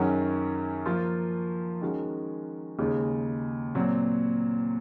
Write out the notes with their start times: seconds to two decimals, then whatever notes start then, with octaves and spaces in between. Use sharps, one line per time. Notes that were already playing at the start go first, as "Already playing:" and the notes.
Already playing: F#2 D#3 F#3 C#4 G#4
0.86 F3 A#3 F4
1.81 D#3 G#3 C#4 F#4
2.79 D#2 C#3 G#3 D#4
3.75 A#2 F#3 C4